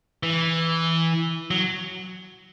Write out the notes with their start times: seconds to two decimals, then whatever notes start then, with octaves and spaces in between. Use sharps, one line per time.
0.23 E3
1.51 F#3